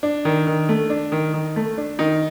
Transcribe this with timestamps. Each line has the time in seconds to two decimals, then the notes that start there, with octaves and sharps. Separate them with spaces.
0.03 D4
0.25 D#3
0.47 D#3
0.69 A3
0.90 D4
1.12 D#3
1.34 D#3
1.56 A3
1.78 D4
1.99 D#3 D#4